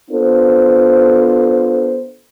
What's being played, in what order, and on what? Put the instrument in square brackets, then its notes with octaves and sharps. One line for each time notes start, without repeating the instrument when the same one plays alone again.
[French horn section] B3 D4 F4 A4 C5